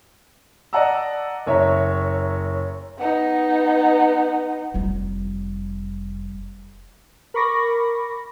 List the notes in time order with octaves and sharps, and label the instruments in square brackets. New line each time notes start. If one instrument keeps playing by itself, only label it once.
[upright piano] D5 D#5 F#5 A5 A#5 E6
F#1 C#5 E5 A#5
[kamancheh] B3 D#4
[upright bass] F1 G3
[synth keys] A#4 B5 C#6 D6 A#6